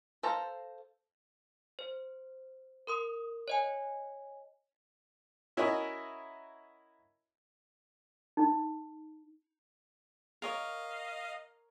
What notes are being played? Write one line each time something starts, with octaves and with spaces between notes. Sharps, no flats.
A4 C5 F5 A5 A#5
C5
A#4 C6 D#6
C#5 D#5 G#5
C#4 E4 F#4 A#4 C#5 D#5
D#4
A#4 C#5 D#5 F5